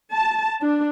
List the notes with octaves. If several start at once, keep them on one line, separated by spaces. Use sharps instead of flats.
A5
D4